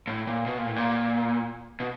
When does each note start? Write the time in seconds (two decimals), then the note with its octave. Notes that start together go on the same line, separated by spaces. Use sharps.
0.07 A2
0.27 A#2
0.46 B2
0.57 A#2
0.66 A2
0.76 A#2
1.80 B2